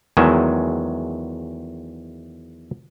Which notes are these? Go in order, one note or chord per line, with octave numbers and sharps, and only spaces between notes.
E2 D#3 F#3 G#3 A3 E5